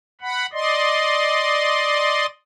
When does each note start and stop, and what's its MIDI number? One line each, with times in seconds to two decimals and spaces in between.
0.22 0.46 78
0.22 0.46 83
0.53 2.26 74
0.53 2.26 75
0.53 2.26 84